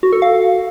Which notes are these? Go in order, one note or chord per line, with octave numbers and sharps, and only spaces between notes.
F#4
A4
F5